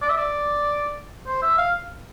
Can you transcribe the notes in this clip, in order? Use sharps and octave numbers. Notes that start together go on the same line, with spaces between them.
D5
E5
D5
C5
E5
F5